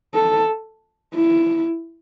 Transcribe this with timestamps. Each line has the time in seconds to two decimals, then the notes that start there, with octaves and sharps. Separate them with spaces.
0.14 A4
1.15 E4